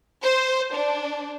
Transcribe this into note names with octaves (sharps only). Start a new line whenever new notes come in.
C5
D4